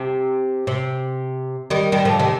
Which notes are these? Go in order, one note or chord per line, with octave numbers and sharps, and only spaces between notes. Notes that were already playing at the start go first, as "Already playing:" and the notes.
Already playing: C3
C3
D#3 G3
D#3 G3
D3 F3
C3 D#3